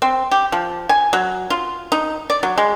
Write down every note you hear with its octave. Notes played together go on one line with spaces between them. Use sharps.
C4
G4
F3
G#5
F#3
F4
D#4
D5
F#3
G#3